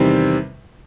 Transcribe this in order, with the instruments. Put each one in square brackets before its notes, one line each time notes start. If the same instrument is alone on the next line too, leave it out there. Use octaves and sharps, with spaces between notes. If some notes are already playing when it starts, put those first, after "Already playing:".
Already playing: [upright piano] E2 C3 D#3 G3 C4